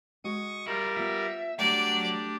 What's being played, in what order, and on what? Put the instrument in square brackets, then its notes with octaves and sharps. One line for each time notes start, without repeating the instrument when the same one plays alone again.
[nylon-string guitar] G#3 F#4 D#5 [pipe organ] C#6 D#6
[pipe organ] G3 A#4 [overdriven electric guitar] E4 F4
[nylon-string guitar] B3 F4 [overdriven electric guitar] E5
[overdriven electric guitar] F#3 [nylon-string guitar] G3 A3 [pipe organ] D4 G4 [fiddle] D5